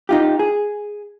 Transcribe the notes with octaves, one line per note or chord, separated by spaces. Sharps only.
D#4 F4 G4
G#4